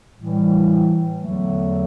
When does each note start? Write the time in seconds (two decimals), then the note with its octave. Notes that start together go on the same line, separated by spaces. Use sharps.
0.16 A2 E3 G3
1.18 E2 D3 F#3 A3